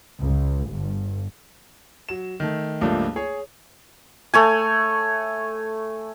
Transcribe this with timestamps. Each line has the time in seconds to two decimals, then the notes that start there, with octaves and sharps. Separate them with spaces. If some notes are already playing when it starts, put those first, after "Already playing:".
0.21 C#2
0.70 G1
2.09 F#3 E7
2.40 D#3 A3
2.81 C#2 G2 F3 A3 A#3 D4
3.16 G#4 C#5
4.34 A3 C#5 G#5